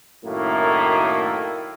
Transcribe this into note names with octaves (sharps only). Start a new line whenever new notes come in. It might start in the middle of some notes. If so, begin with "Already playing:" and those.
F#2 A2 D#3 A3 A#3